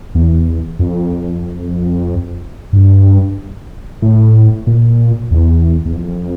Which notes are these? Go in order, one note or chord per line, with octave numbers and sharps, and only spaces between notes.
E2
F2
G2
A2
A#2
E2
E2
F2